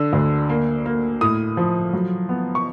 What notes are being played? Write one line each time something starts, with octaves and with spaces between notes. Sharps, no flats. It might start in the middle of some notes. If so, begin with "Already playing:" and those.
Already playing: D3 E6
D2
A#3
A#3
A2 D#6
F3
F#3
B3
C#6